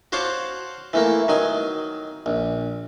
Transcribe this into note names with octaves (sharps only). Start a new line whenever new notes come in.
F#4 C5 C#5 F5 A5 D6
E3 A3 A#3
D#3 F#3 G#5
A#1